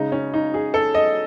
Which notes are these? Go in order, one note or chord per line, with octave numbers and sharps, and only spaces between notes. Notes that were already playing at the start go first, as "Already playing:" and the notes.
Already playing: C#3 G#3 D#4
C#4
D#4
G#4
A4
D#5